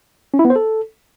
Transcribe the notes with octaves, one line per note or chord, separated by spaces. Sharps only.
C#4
E4
B3
C5
A4